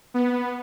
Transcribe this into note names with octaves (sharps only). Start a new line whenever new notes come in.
B3